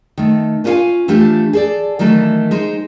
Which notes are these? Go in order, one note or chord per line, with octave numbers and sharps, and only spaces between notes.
D#3 A3
B3 C#4 F4 D5 F5 G#5
E3 A3 D4 F4 G4
G#4 A4 D5
D#3 E3 F#3 A3 A4
G#3 D#4 C5